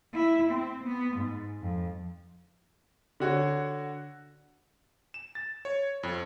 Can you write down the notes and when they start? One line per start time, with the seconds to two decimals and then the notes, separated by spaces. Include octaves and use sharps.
0.14 E4
0.51 C4
0.84 B3
1.17 G#2
1.62 F2
3.20 D3 F#4 C#5
5.14 E7
5.35 A6
5.65 C#5
6.03 F2